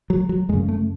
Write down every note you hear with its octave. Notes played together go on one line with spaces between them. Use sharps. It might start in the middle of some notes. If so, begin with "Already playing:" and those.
F#3
F#3
F#2 C#3 G#3
A3